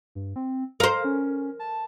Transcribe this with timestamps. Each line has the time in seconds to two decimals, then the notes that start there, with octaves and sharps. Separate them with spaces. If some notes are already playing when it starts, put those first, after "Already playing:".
0.15 G2
0.36 C4
0.80 A#4 C5 F5
1.04 C#4
1.59 A5